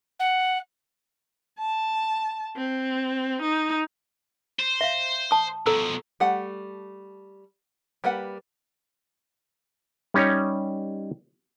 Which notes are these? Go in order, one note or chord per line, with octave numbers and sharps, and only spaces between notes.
F#5
A5
C4
D#4
C5
E5 F5
A5 D#6
B2 F3 A4 A#5 E6
G3 A3 F#5
G3 A#3 B4 F#5
G3 C#4 D#4 G4 C#5